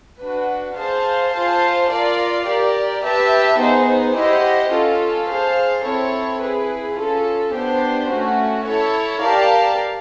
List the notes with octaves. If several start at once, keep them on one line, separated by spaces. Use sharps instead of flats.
D4 F#4 B4
G#4 C5 F5 A5
F4 G#4 C5 F5 A5
F4 A#4 D5 F5
G4 A#4 D5
G4 B4 E5 A5
B3 D#4 G#4 C5
E4 G4 C5 D#5 F#5
C#4 F4 A4
G#4 C5 F5 A5
C4 E4 A4 C#5
E4 G#4 B4
C#4 F4 A4
B3 D4 G4 C5
A3 C#4 F#4
E4 A4 C#5
G4 A#4 D5 F5 A5